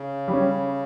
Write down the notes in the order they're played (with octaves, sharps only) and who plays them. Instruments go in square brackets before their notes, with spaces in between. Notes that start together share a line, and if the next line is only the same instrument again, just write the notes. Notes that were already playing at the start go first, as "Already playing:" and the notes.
Already playing: [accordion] C#3
[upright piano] G3
C#4